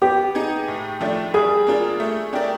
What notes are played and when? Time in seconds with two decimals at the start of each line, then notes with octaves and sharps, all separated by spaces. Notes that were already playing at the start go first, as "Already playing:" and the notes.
0.02 B3 G4
0.35 D#4 G#4
0.68 A2
1.01 F3 A3 D4
1.34 G3 G#4
1.67 A#3 D4 F4
2.00 A3
2.33 D4 G4 A#4 D5